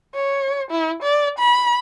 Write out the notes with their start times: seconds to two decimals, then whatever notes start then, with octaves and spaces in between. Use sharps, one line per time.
0.14 C#5
0.71 E4
1.02 D5
1.38 B5